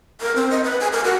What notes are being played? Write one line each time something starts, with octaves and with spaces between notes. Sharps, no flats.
A#4
C4
D#5
B4
G#5
A#4
F#4